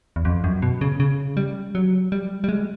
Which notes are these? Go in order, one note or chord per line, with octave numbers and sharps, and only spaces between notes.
E2
F2
F#2
B2
C#3
C#3
G3
F#3
G3
G3
G#3